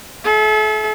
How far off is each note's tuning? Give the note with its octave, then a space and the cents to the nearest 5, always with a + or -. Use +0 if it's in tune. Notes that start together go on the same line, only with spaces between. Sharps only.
A4 -45 E5 +0